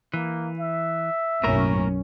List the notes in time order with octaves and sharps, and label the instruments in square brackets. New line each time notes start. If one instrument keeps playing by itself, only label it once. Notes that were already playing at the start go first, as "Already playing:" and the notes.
[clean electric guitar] E3 [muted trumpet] A#3
[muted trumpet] E5
[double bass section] B1 F#2 C#4 [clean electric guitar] A2 A#3 A#4